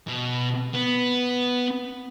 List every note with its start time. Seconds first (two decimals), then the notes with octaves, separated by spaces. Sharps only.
0.08 B2
0.75 B3